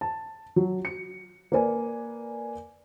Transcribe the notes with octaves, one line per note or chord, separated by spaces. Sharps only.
A5
F#3
C#7
A#3 A#4 B4 D5 G#5